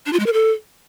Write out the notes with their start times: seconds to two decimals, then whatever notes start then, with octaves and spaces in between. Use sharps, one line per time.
0.06 D4
0.13 F4
0.20 G#3
0.26 A#4
0.33 A4